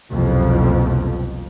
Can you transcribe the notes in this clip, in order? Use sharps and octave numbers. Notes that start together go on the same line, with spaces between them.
F#1 C2 F2 B2 F3